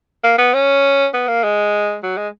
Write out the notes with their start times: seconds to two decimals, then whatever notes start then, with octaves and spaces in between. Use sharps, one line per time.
0.24 A#3
0.38 B3
0.54 C#4
1.14 B3
1.28 A#3
1.44 G#3
2.03 F#3
2.17 G#3